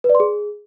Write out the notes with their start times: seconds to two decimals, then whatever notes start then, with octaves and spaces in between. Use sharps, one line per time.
0.04 B4
0.09 D5
0.15 C6
0.20 G#4